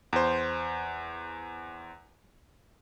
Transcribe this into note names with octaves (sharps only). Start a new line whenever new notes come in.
E2 C5